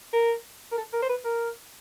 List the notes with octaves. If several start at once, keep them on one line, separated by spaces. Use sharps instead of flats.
A#4
A#4
A4
A#4
C5
B4
A#4